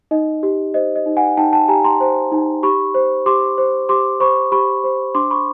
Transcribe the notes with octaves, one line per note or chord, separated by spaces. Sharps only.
D#4 D#5
G4
C5 D#5
D#5
D#4
F#5 G#5
D#4 G5 A5
G5 A5
G4 G#5 A#5
A#5 C6
C5
D#4
G4 B5 C#6
C5
G4 C6 D6
C5
G4 C6 D6
C5 B5 C#6
G4 B5 C#6
C5
D4 C6 D6
B5 C#6